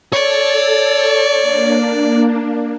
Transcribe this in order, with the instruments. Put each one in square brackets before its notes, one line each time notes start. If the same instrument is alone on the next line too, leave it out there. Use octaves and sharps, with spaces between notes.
[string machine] A4 A6 [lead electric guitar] C#5 [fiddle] D5
[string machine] A#3 D4